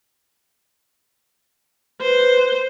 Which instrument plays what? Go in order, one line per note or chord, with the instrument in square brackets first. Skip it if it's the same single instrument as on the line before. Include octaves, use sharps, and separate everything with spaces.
[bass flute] B4 [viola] C5